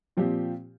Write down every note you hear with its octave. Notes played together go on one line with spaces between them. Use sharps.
A#2 F3 C4 G4